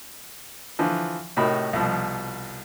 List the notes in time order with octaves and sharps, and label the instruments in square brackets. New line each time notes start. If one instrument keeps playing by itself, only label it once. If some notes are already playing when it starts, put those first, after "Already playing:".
[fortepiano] D3 E3 F3
A2 C3 D#4 F#4 A#4 B5
C2 B2 F3